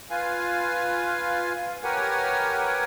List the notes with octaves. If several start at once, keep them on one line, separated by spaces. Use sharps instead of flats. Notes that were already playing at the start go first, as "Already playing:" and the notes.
F4 B4 F5 G#5
G4 A#4 B4 C#5 F#5 G#5